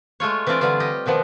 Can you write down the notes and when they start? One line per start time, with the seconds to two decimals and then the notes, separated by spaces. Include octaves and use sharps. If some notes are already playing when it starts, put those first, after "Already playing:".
0.20 G#3 A3 F4 C#5
0.47 E3 C4 D4 F4 D5
0.61 D3 E3 G3 F4
0.80 G4 D#5
1.06 B2 D#3 F3 B3